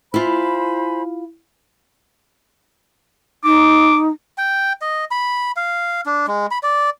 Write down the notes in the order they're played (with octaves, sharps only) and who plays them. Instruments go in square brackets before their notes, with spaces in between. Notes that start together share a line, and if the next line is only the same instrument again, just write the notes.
[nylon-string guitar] E4 F4 [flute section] C5 G#5 B5
[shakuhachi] D#4 [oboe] D6
[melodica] G5
D#5
B5
F5
D4
G#3
B5
D5